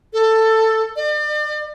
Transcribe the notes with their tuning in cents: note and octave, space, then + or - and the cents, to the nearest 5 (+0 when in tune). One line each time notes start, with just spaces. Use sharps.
A4 +15
D5 +40